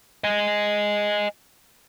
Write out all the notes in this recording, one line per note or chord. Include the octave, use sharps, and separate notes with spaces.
D#5 G#5